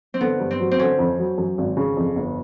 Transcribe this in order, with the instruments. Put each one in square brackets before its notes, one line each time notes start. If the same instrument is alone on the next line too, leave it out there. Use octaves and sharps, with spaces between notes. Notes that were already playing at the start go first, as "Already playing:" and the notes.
[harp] C4
[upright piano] D3 [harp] B3
[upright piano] G2
[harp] C4
[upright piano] F#3
[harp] C4
[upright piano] D3 [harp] C#4
[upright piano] F2
F#3
F#2
G#1
C#3
F2
G1